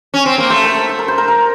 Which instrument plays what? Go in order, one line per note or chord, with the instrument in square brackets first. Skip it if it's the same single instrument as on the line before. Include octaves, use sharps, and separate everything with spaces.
[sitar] C#4
C4
A#3
[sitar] A3 [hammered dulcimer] C5
[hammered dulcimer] A#4
A4
A4
A#4
C5
A#4
A#4